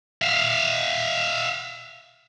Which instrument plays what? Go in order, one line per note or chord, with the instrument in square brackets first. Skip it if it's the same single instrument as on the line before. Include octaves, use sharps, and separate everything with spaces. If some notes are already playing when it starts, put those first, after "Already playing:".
[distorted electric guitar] E5 F5